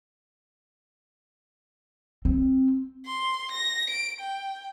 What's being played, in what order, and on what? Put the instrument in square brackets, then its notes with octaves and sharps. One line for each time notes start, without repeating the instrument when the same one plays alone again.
[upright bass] C4
[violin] C6
A#6
D7
G5